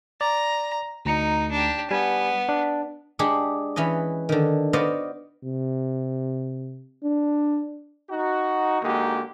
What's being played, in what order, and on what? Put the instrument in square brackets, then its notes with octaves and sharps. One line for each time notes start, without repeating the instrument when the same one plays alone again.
[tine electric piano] D5 [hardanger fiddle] A#5
[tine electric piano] D2 A#5 C#7 [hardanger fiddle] D#4
[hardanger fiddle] D4 G4
[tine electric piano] G3 G#5 [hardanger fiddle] B3
[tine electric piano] D4
[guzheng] G#3 D4 G4 G#4 F#5 G5
E3 C#4 B4 D#5
D3 D#3
B3 F#4 C5 D5 D#5 F5
[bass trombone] C3
D4
[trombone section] D#4 F#4
D3 G#3 A#3 D#4 F#4 G4